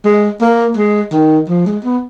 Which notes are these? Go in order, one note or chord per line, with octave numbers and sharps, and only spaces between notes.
G#3
A#3
G#3
D#3
F3
G#3
B3